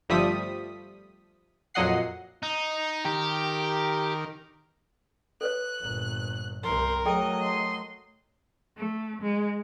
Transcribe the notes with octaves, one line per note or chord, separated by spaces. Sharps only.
G1 F3 G3 A3 D#6 B6
F2 A#2 F#3 D#5 F#5 C7
D#4
D#3 G4 A#4
A4 B4 C#5 F#6
G1 A#2
C2 C3 A#4 C6
F#3 A3 G#4 A4 D#5 G5
C6
A3
G#3